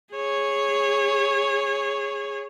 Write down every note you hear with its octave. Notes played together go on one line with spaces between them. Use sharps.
G#4 C#5